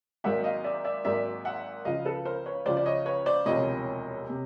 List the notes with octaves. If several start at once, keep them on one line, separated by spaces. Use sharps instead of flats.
G#1 G#2 D#3 F#3 A#3 E5 F#5
D#5 F5
D5 E5
D5 E5
G#1 G#2 D#3 F#3 A#3 D5 E5
E5 F#5
C#2 C#3 F3 D#5 F5
A4 B4
A#4 C5
B4 C#5
C#2 C#3 F3 C5 D5
D5
C#5 D#5
B4 C#5
C5 D5
E1 D2 C3 F3 C#5 D#5
C3